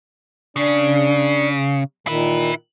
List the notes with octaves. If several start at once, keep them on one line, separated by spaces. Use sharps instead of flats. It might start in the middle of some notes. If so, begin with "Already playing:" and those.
C#3 D4
A#2 D#3 E4 B4